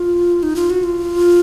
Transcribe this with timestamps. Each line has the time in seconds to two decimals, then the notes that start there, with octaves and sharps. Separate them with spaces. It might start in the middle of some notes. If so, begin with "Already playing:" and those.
Already playing: F4
0.43 D#4
0.56 F4
0.70 F#4
0.83 F4